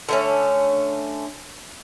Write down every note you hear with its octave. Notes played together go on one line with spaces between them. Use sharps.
D3 A3 C#4